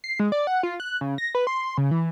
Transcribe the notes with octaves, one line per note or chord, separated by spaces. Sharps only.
C7
G#3
D5
F#5
F4
F#6
C#3
A#6
B4
C6
C#3
E3